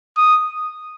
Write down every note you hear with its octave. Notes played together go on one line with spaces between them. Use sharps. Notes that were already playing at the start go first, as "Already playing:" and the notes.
D#6